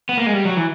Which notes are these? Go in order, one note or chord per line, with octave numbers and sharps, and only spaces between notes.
B3
A#3
G#3
G3
F#3
E3